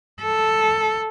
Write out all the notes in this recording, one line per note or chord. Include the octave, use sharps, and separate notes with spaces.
A4